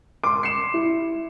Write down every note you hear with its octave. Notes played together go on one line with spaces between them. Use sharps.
C6 D6
C7 C#7 E7
E4